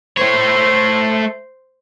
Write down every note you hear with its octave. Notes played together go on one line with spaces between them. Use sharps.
A3 C5 C#5